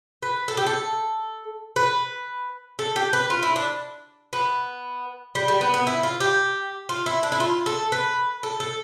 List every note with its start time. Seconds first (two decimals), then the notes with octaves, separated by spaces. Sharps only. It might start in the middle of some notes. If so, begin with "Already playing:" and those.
0.23 B4
0.48 A4
0.57 G4
0.66 A4
1.76 B4
2.79 A4
2.96 G4
3.13 B4
3.30 F4
3.43 E4
3.56 D4
4.33 B3
5.35 G3
5.48 G3
5.61 B3
5.74 B3
5.87 E4
6.03 F4
6.20 G4
6.89 F4
7.06 E4
7.23 D4
7.32 E4
7.40 F4
7.66 A4
7.92 B4
8.43 A4
8.60 A4